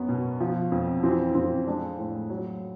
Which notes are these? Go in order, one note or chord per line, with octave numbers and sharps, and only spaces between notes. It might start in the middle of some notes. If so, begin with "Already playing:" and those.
Already playing: F#2 B3
B2
F3
F2
E3 C4
F2 C4
G#3 D4
A2
F#3